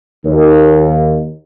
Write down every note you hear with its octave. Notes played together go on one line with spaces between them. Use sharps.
D#2